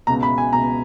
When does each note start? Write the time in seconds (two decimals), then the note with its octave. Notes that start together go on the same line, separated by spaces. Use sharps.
0.07 C#2 B2 A#5
0.23 B5
0.38 G#5
0.53 C#2 B2 A#5